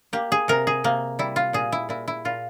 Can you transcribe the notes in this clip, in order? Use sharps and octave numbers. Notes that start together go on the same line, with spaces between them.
A#3 G4
G#4
C3 A#4
G#4
C3 A#3
G3 E4
F4
A#2 G#4
E4
A#2 E4
E4
A#2 F4